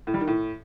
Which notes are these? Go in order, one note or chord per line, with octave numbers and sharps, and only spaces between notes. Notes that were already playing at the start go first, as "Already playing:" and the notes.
A2
G3
D#3
A2